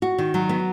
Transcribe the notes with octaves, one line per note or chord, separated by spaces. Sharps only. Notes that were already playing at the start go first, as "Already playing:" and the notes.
F#4
D#3
F#3
B3